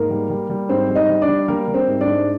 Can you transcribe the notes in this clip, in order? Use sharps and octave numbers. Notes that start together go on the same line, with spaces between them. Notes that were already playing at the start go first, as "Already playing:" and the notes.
Already playing: G#2 A#3 A#4
G3
G3
G3
G#2 C4 C5
G3
D#4 D#5
G3
D4 D5
G3
G3 A#3 A#4
G3
C4 C5
G#2
D4 D5
G#2